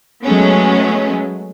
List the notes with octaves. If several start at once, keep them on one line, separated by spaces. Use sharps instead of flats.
F#3 G#3 A3 B3 C#4